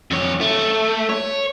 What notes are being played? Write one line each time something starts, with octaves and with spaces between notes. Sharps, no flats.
F2 C#5
A3
C#5